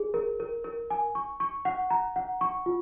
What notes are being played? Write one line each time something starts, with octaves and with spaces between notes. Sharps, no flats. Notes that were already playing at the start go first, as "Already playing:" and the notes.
Already playing: G#4
A#4
A#4
A#4
G#5
C#6
C#6
F#5
A#5
F#5
C#6
F4